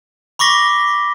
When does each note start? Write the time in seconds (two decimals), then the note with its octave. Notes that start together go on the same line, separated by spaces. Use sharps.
0.39 B5 C#6 D6 A#6 B6 G7